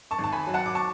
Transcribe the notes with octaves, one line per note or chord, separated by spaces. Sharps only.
A5 C#6
G#1
A5
G#5 B5
F#3
F#5 A5
D6
A5 C#6